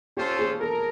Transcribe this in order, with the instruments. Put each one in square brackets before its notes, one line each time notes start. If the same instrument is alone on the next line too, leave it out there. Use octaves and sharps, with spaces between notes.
[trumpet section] C#4 F4 A4 C5 [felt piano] G4
[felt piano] G#4
[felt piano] A4 [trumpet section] A#4